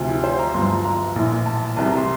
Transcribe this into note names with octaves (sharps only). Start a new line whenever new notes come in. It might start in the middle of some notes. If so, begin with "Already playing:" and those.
Already playing: D2 C3 F3
E4
C5
A#5
G1 G2 F3 C6
A#5
A#5
A#1 A2 E3
A5
C2 C3 E3 A5
A#5
C6